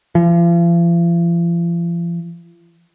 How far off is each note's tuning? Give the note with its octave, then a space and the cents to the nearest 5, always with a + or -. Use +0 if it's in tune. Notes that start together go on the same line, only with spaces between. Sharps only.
F3 -40